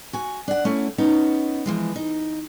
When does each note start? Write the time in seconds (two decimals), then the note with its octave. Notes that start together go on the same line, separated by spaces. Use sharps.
0.13 F#4 G#5
0.48 D4 F#5
0.65 A3 C#4 E4
0.98 B3 C#4 D#4
1.66 E3 F3 G#3
1.96 D#4